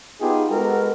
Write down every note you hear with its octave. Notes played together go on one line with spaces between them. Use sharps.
B3 D#4 F4 G4 G#4
G#3 B3 F#4 A4 A#4